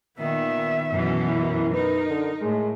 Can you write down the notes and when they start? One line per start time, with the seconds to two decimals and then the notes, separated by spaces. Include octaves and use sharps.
0.19 A#2 D#3 B3 E5
0.91 F#2 B2 E3
1.25 E4 A#4
1.73 D#4 B4
2.08 D3
2.41 A2 G#3